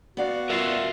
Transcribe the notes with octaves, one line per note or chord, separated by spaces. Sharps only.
B3 F#4 D5 F5
F4 A#4 D#5 E5